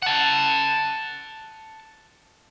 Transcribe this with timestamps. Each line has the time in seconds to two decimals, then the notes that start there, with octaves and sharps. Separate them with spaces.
0.02 F#5 A5